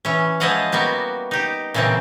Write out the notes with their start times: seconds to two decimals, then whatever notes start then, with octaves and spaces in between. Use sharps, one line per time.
0.05 E3 C#4
0.40 F3 G#3 E4 D#5 F5 F#5
0.72 G3 A#3 B3 F#4
1.31 D#4 G4
1.74 A#2 C#3 E3 A#3 C4